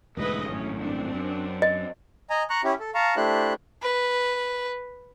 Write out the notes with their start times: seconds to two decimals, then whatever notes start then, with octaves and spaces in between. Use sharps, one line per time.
0.17 E1 D2 G#2 E4 B4 D#5
0.47 G#1 F#2 A2 A3 C#4
0.81 C4 D4
1.14 F#2
1.62 D#5
2.30 D#5 G#5 A#5
2.50 A#5 C#6 F#6
2.64 C#4 E4 G4
2.80 A4
2.94 F5 A5 A#5 C#6
3.16 A3 D4 E4 G4 C5 F#6
3.83 B4